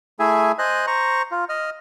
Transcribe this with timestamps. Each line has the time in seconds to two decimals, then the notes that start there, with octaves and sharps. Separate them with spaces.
0.20 A3 E4 G#4 E5 G#5
0.59 C5 D#5 G#5 F#6
0.87 C5 A#5 C#6
1.31 F4
1.49 D#5 F6